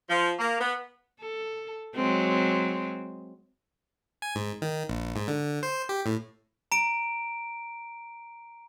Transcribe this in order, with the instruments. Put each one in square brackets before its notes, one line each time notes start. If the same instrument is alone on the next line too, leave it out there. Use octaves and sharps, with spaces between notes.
[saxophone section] F3
A#3
B3
[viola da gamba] A4
F#3 G#3 C4
[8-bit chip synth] G#5
G#2
D#3
A#1
G#2
D3
C5
G4
A2
[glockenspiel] A#5 D7